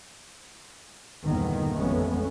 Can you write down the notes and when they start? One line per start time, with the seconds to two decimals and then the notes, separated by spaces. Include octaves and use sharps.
1.24 G1 E2 A#2 D#3 B3
1.74 A1 F2 G#3 A3 B3 C#4